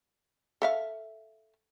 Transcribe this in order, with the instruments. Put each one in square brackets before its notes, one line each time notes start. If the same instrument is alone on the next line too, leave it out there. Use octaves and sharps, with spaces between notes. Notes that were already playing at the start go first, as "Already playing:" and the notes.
[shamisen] A4 E5 F5